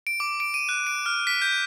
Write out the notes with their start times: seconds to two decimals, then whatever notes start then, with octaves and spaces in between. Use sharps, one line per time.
0.07 D7
0.20 D6
0.40 D7
0.54 D#7
0.69 F#6
0.87 D7
1.06 F6
1.27 B6
1.42 G6